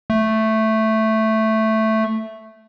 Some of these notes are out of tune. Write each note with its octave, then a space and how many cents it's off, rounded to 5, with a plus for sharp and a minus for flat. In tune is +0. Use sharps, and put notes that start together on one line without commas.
A3 +0